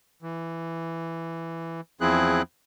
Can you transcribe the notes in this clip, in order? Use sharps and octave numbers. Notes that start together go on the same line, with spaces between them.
E3
E2 F3 C4 E4 G#4 F#6